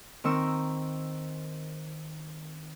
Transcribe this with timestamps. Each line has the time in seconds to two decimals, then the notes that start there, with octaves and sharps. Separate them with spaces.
0.24 D#3 C4 A#4 C#6 E6